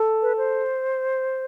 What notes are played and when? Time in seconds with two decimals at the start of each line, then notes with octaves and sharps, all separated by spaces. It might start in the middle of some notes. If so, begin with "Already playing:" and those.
Already playing: A4
0.22 B4
0.37 C5